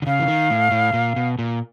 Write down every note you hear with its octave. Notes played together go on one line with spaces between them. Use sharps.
D3
C#3 F5
E3
D#3
A2
A2
A#2
B2
A#2